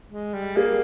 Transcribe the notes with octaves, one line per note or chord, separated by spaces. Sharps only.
G#3
G3
A#3 G#4